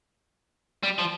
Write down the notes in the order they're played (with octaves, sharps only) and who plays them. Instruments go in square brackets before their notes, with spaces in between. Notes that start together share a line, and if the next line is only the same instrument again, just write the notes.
[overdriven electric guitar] G3
F3